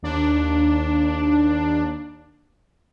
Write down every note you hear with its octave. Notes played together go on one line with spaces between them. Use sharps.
D#2 D4